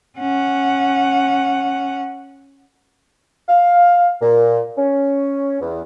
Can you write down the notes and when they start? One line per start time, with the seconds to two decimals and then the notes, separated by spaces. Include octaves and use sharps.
0.19 C#4 F#5
3.49 F5
4.21 A#2
4.78 C#4
5.60 E2